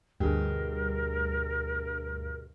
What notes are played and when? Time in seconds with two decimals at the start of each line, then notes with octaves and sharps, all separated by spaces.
0.20 D2 G2 B2 G4 G#4 A#4